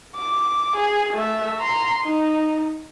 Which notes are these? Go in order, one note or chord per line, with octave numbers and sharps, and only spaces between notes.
D6
G#4
A3 E5
A#5 C6
D#4